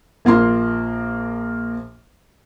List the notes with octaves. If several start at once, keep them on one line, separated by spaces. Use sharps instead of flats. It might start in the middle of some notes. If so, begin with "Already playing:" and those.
A#1 A#3 F4 C6